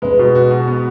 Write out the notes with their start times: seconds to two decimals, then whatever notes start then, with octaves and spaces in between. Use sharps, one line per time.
0.02 G#3 B4
0.19 B2
0.35 F#4
0.51 B2
0.68 B3